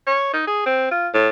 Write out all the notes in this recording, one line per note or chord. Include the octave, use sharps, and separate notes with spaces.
C#5
D#4
G#4
C4
F4
A2